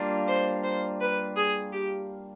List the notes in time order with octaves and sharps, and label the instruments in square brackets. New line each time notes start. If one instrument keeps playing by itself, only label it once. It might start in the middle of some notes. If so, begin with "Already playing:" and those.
Already playing: [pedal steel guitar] G3 A#3 D4 F4
[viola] C5
C5
B4
G#4
G4